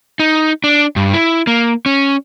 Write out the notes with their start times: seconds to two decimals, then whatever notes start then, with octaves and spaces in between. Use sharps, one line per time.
0.20 D#4
0.64 D4
0.96 G2
1.14 E4
1.47 A#3
1.86 C#4